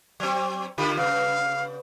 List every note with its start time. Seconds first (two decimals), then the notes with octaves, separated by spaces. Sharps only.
0.20 F#3 C4
0.78 D3 F4 G4 B5
0.97 C#3 B3 F5